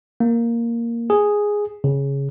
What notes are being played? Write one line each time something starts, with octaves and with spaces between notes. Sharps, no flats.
A#3
G#4
C#3